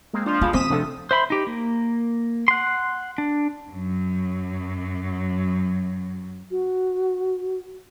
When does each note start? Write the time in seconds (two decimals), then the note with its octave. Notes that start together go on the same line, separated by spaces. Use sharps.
0.13 G#3 A#3 C4
0.26 F3 D4 F4
0.41 G#2 G#3 F4 F5 B5
0.53 D#2 C4 C5 D#6 B6 D#7 E7
0.70 C3 F3 A3 D4 A4
1.11 C5 E5 B5 C6
1.30 D#4 G4
1.47 A#3
2.48 F#5 C6
3.18 D4
3.71 F#2 F#3
6.51 F#4